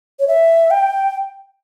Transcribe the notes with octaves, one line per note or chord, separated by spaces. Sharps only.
C#5
E5
G5